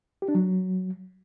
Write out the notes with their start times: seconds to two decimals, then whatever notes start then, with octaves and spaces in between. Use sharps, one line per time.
0.22 G4
0.28 D4
0.35 F#3